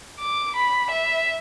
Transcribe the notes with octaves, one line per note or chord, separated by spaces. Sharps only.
D6
B5
E5